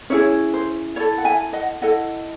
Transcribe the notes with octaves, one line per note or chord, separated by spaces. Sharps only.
C#4 E4 G#4 C#5
C5
E4 A4 C#5
F#5
E5 G#5
D#5 F#5
E4 A4 D#5 F#5